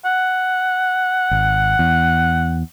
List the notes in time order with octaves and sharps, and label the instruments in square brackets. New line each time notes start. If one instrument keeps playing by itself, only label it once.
[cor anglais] F#5
[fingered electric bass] G#1
E2